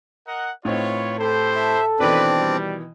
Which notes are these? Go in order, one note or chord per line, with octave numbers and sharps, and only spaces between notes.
A#4 D#5 F#5
A2 C4 D#4 F4 B4 C#5
E4 G4 A4 C5
E5
B2 D#3 E3 C4 D4 B4 D5
G3